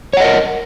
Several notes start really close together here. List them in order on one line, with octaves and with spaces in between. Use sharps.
C#5 F#5 D#5 A#4